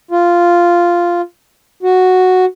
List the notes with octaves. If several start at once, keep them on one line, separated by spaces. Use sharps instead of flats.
F4
F#4